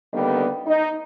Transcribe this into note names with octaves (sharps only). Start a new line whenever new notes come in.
D3 D#3 G3 A#3 B3
D#4